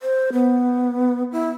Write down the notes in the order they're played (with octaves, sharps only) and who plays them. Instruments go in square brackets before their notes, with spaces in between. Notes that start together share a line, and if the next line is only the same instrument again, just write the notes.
[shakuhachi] C5
B3
E4